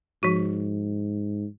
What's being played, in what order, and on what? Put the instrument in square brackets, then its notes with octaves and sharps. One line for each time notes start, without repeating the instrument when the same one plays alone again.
[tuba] G#2 [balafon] F3 F#4